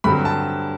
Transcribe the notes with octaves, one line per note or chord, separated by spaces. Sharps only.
G2 D3 F#3 C4 B5
A5